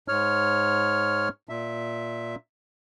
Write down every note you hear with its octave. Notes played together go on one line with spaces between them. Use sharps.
G#2 C#5 F6
A#2 E5